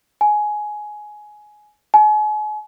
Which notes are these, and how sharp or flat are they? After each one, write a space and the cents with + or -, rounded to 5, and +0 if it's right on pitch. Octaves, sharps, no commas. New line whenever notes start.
G#5 +15
G#5 +40